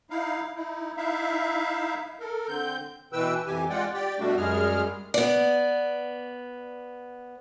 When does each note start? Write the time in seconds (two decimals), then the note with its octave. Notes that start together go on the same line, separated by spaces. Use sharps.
0.10 D#4 E4 F5
0.56 D#4 E4
0.97 D#4 E4 E5 F5
2.20 A4 A#4
2.48 D3 C4 G6
3.13 B2 E3 B4 G5 E6
3.47 F2 E3 G4 G#5
3.70 G#3 F4 D5 F#5 G5
3.94 G4 D5 G5
4.19 B2 G3 A3 D4 F#4
4.37 F#2 G3 G#3 G#4 F6
5.14 B3 D5